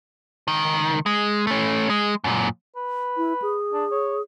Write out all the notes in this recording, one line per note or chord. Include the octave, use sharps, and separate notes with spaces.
C#2 D#3
G#3
A3 C#4
G#3
F#2 A#2
B4
E4
G#4
D4
C#5